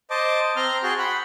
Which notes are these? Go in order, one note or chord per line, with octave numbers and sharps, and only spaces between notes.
C5 D#5 A5 D6
C4 A#5 C6 F6
F#4 G#4 G5 A5 C6
F#5 B5